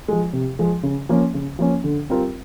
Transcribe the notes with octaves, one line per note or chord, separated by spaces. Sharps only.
F3 G#3
C3
F3 G#3
C#3
F3 A#3 C#4
C#3
F3 A#3 C#4
D3
G3 C4 F4 A#4